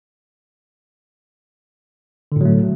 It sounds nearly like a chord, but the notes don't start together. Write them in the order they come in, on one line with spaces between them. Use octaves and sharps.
D3 A2 F#3 A3